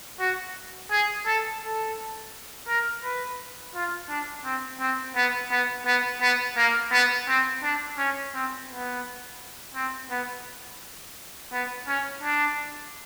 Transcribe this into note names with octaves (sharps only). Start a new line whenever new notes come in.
F#4
G#4
A4
A4
A#4
B4
F4
D4
C4
C4
B3
B3
B3
B3
A#3
B3
C4
D4
C#4
C4
B3
C4
B3
B3
C#4
D4